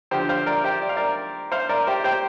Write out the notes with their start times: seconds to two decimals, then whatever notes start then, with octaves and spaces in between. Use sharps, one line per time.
0.11 D2 D3 F3 G4 C5
0.29 C5 F5
0.46 A#4 D5
0.64 G4 C5
0.82 D5
0.89 F5
0.97 A#4 D5
1.52 C5 F5
1.69 A#4 D5
1.87 G4 C5
2.04 G4 C5